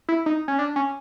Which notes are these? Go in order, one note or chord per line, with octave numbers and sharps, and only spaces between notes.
E4
D#4
C#4
D4
C#4